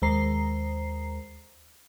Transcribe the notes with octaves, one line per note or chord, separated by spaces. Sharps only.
D#2 G#3 C5 A#5 C7